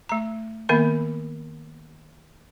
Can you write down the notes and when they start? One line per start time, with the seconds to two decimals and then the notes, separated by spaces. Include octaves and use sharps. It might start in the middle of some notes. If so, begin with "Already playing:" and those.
0.09 A3 A#5
0.69 D#3 A#3 B3 E5 B5